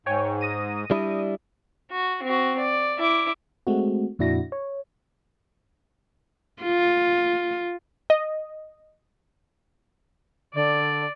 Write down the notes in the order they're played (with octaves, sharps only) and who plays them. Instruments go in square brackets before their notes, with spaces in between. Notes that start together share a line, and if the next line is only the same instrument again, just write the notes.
[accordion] G#2 [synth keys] C#5 G5 G#5
[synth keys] D#6 A#6 D#7
[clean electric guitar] G3 D4 E4
[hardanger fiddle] F#4
C4 F#4
D5
E4 D6
[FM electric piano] G#3 A3 C4 F#4
F2 A#2 D4 E4 F#4 A#6
C#5
[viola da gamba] F4
[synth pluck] D#5
[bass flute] D3 [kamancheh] D5